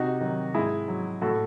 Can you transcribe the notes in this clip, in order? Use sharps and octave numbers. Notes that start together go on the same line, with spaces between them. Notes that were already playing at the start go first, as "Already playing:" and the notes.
Already playing: C3 D#4 F#4
D#3 F#3
G#2 E4 G#4
F#3
A2 F#4 A4